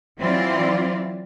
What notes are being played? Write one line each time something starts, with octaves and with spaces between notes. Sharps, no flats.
E3 F#3 C4 E4 F4 D5